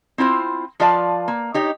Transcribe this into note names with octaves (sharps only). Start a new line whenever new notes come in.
C4 E4 F4 C5
F3 F4 B4 D5 F5 A5
A#3
D#4 G4 C#5